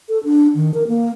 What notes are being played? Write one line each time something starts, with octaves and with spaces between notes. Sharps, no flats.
A4
D4
D#3
A#4
A#3